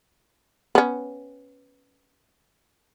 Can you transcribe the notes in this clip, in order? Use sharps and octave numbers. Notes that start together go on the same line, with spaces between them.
B3 C#4